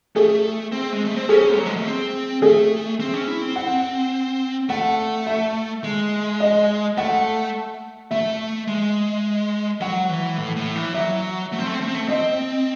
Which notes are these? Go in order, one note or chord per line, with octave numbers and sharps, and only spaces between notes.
A3 G#4
C4
G#3
A3
C4
C#4 G#4
F#3
G#3
A3
C4
A3 G#4
C4
C#4
E4
C4
F#5
A3 F#5
E5
G#3
D#5
A3 F#5
A3 E5
G#3
F#3 F#5
E3
A2
A2
E3
F#3 E5
A3
C4
A3
C4
A3
C4
A3
C4 D#5